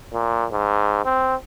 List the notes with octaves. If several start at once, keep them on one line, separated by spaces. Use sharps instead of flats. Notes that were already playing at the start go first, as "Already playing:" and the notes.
A#2
G#2
C4